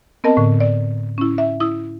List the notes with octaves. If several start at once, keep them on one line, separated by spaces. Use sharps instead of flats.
B3 C4 A#4 D#5 A5
A2 D3
D5
C#4 E4
E5
E4 D#6